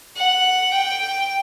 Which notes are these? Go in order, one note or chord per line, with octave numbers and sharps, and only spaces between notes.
F#5
G5